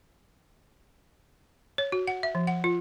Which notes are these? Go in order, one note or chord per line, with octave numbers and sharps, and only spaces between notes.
C#5
F#4
F#5
E5
F3
F#5
F4